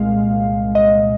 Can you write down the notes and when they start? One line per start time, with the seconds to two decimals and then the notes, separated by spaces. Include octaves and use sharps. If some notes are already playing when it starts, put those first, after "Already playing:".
Already playing: C2 A#2 G#3 F5
0.75 D#5